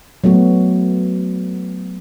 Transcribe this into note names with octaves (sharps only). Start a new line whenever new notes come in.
F#3 A3 B3 F#4